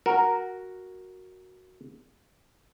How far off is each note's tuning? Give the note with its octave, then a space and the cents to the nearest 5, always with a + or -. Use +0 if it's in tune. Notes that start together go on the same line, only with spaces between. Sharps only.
F#4 +0 A#4 +0